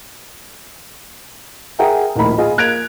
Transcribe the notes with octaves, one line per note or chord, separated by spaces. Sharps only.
G#4 A#4 E5 F#5 G5 A#5
D#1 A#1 A2 D#4 A#4 B5
F4 G#4 D#5
A#3 F#6 G#6 D7 F7